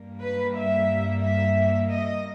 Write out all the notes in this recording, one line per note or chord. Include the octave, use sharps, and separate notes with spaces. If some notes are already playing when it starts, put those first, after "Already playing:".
Already playing: G2 G3 A#3
B4
E5
E5
D#5